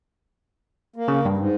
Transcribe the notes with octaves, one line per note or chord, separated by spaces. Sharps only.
A#3
C#3
G2
G#2